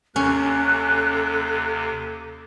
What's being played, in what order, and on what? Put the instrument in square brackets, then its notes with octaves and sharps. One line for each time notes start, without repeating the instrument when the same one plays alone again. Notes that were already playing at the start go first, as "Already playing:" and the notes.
[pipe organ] D#2 C3 [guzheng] C#4 [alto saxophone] A4 [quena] F#6